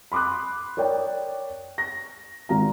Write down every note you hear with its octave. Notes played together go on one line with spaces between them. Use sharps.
B5 C6 D6 D#6 F#6
A#4 C#5 D5 G5
A#6
G#1 F4 A#5